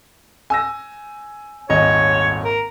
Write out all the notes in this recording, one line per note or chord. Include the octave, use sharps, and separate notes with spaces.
G#5 E6 A#6
D#1 G#1 C#5 D#5
A#4